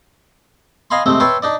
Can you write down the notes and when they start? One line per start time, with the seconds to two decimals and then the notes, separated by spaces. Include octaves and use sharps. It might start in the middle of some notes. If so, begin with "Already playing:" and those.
0.91 D#5 F5 G#5 B5 C6
1.06 C3 G#3 A3 C4
1.20 B4 C#5 E5 G5 A5 C6
1.42 D4 D#4 D5